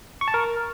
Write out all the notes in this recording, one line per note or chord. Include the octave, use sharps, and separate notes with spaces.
C#6
A5
A#4